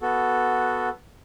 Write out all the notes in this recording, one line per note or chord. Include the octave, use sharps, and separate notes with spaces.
B3 F#4 A4